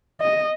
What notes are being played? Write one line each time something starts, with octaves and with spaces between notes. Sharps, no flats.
D#5